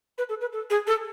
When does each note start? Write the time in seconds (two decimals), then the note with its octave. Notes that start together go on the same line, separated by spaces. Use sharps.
0.18 B4
0.29 A4
0.40 B4
0.52 A4
0.70 G#4
0.87 A4